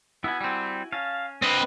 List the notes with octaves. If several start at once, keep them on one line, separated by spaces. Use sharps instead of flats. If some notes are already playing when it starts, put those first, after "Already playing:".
B3 E4 F#4 G#5
G3 C4
C#4 F5 A5
C4 B4 D#5